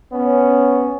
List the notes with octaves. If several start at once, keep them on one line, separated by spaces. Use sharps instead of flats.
B3 C#4